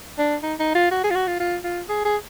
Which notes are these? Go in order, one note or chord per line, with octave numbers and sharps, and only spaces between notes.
D4
D#4
D#4
F4
F#4
G#4
F4
F#4
F4
F4
F4
G#4
G#4